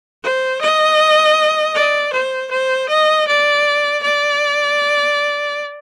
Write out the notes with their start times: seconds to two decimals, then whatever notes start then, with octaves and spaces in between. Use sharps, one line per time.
0.23 C5
0.61 D#5
1.75 D5
2.13 C5
2.51 C5
2.89 D#5
3.27 D5
4.03 D5